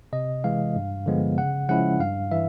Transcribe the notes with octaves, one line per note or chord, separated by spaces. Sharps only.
C3 D#5
E3 G#3 F5
G2
D3 F3 G#3 B3
C#3 F#5
F3 G#3 C#4 E4 F#5
G2 F5
E3 E5